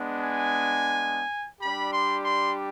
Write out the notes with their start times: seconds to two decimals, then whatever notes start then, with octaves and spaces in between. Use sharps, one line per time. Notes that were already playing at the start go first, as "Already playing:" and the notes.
Already playing: G#3 B3 D4
0.20 G#5
1.61 G3 D4 G4 B5
1.92 C6
2.24 C6